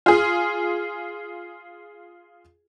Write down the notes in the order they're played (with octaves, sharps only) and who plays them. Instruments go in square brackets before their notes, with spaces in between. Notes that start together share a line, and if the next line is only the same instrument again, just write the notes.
[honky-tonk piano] F4 G#4